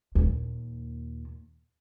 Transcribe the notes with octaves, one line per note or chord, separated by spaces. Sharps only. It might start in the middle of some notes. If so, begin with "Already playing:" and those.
D#2 A#2